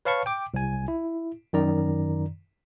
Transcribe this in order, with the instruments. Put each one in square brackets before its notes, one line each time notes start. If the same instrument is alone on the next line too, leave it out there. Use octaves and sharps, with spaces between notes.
[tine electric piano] B4 C#5 F5 A5 B5 C#6
G5 D6
C2 G#5
E4
F#2 D#3 D5 A#5